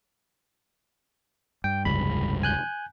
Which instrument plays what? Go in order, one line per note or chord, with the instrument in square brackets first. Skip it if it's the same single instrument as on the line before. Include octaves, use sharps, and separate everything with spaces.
[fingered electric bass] G2 [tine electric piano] G5
[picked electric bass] F1 C#2 [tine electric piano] B5
[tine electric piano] G#5 F#6 G6